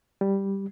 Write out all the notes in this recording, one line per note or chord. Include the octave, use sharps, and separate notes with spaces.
G3